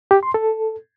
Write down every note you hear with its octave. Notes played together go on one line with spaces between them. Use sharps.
G4
C6
A4